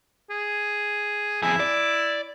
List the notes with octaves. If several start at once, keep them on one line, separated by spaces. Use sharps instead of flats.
G#4
F2 E4 G#4
D5